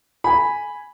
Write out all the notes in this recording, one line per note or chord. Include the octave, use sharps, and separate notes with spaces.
G#5 B5